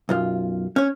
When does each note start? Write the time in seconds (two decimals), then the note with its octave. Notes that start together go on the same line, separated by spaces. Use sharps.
0.09 B1 F#2 F4
0.76 C#4 C#5